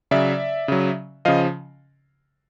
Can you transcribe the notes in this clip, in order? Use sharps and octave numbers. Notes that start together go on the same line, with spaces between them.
C#3 F#3 D5 E5
C#3 F#3
C#3 F3 D#5 F5